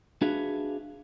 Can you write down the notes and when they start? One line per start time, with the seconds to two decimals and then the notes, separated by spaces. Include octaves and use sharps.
0.22 D4 F#4 G#4 B4 E5 F5